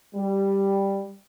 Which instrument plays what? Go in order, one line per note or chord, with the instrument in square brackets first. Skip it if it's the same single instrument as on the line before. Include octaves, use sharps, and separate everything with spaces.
[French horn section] G3